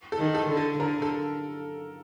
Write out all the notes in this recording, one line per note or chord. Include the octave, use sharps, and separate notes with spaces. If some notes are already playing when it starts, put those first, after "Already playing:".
A4
D#3
A4
D3
A4
D3 A#4
A4